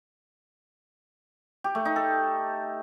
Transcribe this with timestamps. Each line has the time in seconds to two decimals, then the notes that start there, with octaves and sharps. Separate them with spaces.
1.64 G4
1.75 A3
1.85 D#4
1.96 A4